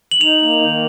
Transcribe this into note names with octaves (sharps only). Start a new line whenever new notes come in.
F#7
D#4 F7
A#3
D#3